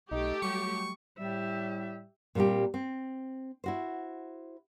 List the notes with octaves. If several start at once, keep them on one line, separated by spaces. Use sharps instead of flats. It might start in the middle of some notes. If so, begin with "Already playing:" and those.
B1 A3 D#4 G4
F#3 G3 C#6
A2 G3 G4 E5
A#2 G3 A#3 C4 G4
C4
E4 F#4 C5